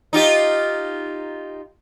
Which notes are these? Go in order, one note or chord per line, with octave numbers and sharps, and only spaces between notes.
D#4 F4 G4